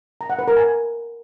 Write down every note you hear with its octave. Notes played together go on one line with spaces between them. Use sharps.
A#5
F#5
B4
A#4
G#5